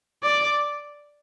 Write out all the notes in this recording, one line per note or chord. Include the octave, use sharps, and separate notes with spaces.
D5